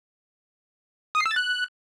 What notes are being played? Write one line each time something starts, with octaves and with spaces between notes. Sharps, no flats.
D#6
C7
E6
A6
F#6